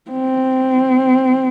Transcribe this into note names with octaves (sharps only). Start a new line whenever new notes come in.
C4